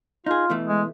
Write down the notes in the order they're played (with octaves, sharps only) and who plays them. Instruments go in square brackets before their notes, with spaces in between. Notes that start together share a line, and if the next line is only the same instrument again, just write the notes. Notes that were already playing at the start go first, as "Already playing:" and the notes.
[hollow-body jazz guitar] D#4 G#4 [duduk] F4
[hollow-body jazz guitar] B2 E3 A3
[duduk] G#3